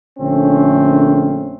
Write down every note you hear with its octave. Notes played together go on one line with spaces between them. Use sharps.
A#1 D3 A3 C4 C#4